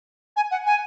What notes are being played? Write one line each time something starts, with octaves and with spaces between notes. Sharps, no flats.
G#5
F#5
G#5